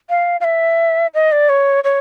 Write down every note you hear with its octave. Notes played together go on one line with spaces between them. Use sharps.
F5
F5
E5
D#5
D5
C#5
C#5